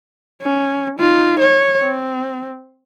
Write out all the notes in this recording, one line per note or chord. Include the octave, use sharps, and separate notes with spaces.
C#4
D#4 F4
C#5
C4